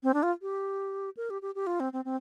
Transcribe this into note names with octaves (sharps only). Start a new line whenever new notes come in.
C4
D4
F4
G4
A#4
G4
G4
G4
F4
C4
C4
C4